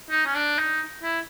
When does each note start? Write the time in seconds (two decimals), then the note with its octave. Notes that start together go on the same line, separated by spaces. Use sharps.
0.10 D#4
0.26 C#4
0.35 D4
0.59 D#4
1.03 E4